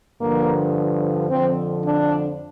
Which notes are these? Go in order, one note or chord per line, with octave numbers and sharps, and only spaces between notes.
G2 D3 F3 A#3
F2 D3 F3 C4
D4